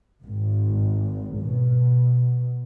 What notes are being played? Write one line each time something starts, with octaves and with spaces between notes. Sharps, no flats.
G#1
B2